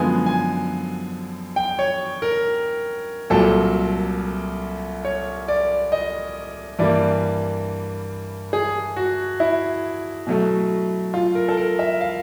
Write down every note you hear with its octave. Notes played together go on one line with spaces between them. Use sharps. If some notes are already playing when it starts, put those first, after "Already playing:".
Already playing: F#2 D3 F3 G#3 B3 G#5
G#5
G5
C#5
A#4
C2 A#2 F#3 A4
C#5
D5
D#5
G2 E3 G3 A#3 D5
G#4
F#4
E4
B2 F#3 A3
F4
A#4
A4
A#4
E5
F5